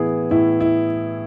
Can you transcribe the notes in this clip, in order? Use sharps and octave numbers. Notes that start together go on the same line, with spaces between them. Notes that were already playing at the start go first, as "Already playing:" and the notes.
Already playing: A2 E3 B3 E4 G#4
A2 E4
E4